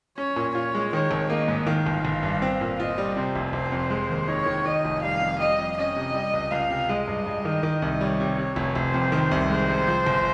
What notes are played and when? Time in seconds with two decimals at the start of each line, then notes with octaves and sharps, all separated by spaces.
0.18 C#4 C#5
0.36 A#2
0.55 F4 C#5
0.75 G#3
0.93 D#3 C#5
1.11 G#1
1.29 A#3 D#5
1.48 G#2
1.67 D#3 F5
1.86 G1
2.05 G1
2.23 G2
2.42 C4
2.61 A#2
2.79 F4 D#5
2.98 G3
3.17 C3 C5
3.36 F1
3.53 F1 C5
3.72 F2
3.90 G#3
4.09 D#2
4.28 D#4 C#5
4.46 D#3
4.65 D#3 D#5
4.85 F1
5.02 G3 F5
5.22 F2
5.39 G3 D#5
5.59 F2
5.77 C#4 D#5
5.96 C3
6.14 G3
6.33 C#2
6.51 C#2 F5
6.70 C3
6.89 G#3 D#5
7.07 G2
7.26 G2
7.45 D#3
7.63 D#3
7.82 C2
8.00 G3 C#5
8.20 C3
8.38 C3
8.56 F1
8.76 F1 C5
8.94 F2
9.12 D#3
9.31 C2
9.50 G#3 C5
9.68 C3
9.87 F3
10.06 G1